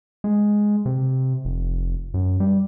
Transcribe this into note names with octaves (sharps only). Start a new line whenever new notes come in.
G#3
C3
F1
F#2
G3